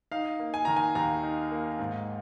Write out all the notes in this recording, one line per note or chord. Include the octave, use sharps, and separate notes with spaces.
D#4 F5
A#3
G#5
D#3 A#5
G#5
D#2 A#5
D#4
A#3
G#2